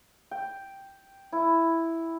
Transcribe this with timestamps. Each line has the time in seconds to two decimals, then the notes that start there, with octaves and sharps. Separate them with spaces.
0.31 G5
1.32 E4